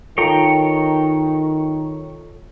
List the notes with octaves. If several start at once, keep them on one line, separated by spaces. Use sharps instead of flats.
D#3 F4 A4 C#5 G5 A#5